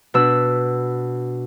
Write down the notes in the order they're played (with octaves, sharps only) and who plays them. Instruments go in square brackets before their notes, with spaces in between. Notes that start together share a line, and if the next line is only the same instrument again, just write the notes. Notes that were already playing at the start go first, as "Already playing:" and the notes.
[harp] B2 B3 D4 E6